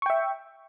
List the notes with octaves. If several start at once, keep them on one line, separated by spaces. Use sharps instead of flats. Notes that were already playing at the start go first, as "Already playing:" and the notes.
E5 G5 C#6